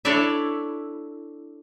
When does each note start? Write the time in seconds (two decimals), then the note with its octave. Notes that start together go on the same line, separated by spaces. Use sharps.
0.05 D4 E4 A4 C#5 D5 E5